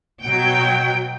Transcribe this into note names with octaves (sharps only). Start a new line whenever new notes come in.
B2 F#3 G5